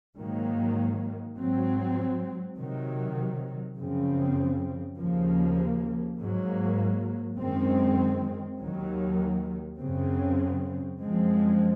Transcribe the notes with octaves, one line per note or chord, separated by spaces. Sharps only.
G#2 D#3 F#3 A#3
G#2 F#3 C4
C3 D#3 F#3
F#2 C#3 F3 C4
D#2 C#3 F3 A#3
G#2 F#3 A#3
F#2 D#3 G#3 C4
D#2 D#3 F#3
F#2 C#3 F#3 C4
F#2 F3 G#3 C4